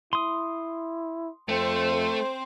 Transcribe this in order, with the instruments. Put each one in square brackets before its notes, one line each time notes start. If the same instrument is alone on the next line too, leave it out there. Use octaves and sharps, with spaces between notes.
[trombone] E4 [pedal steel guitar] C6 D#6
[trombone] F2 [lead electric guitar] A3 [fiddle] C4 C5